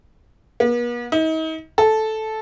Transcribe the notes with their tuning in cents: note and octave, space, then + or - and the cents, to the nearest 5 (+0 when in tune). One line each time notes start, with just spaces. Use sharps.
B3 -45
D#4 +40
A4 -10